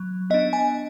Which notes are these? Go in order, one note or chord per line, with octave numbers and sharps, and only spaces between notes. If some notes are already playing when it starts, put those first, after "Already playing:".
Already playing: F#3
B3 D4 D#5
G#5